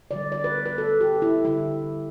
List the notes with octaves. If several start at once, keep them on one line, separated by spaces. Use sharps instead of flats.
D3 G3 D5
D5
B4
B4
A4
G4
E4
D3 G3 E4